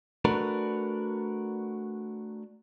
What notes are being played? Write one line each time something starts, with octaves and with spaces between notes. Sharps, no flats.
A3 D4 F#4 A#4 B4